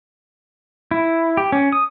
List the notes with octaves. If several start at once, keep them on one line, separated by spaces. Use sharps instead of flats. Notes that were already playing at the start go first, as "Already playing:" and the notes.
E4
G4
C#4
D#6